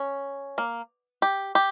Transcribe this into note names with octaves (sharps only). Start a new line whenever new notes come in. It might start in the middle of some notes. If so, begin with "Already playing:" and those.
Already playing: C#4
A#3
G4
G4